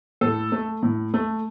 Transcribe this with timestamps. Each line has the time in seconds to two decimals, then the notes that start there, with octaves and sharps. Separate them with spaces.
0.21 A2 A4
0.52 A3
0.83 A2
1.14 A3